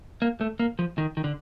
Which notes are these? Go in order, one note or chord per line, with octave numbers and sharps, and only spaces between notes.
A#3
A3
A#3
F3
D#3
D#3
D3